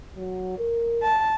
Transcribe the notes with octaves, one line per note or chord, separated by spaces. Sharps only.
F#3
A#4
A5